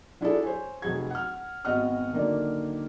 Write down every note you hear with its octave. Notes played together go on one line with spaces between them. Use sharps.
F#3 D4 E4 F4 G#4 A4
C5 C#5 G#5
F1 F#3 G#4 G#6
F#5 F6
G#1 B3 F#4 D#5 F#5 F6
D3 D#3 F#3 A#3 A#4 D5